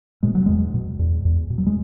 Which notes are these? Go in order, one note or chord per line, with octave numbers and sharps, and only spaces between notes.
B2 G#3
F#3
E2 G#3
B2
E2
E2
B2
F#3
G#3